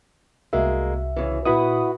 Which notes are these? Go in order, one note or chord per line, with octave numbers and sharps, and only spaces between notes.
C2 G#3 A#3 F#4 E5
C#3 E3
A#2 E4 F#4 B4 B5 D#6